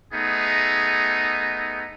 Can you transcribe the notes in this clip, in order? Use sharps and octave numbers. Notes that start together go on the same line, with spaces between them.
A3 B3 D#4 G#4